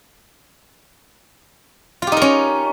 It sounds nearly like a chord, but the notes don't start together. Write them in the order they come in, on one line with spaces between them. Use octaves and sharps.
F4 G4 D#4 A#4 C#4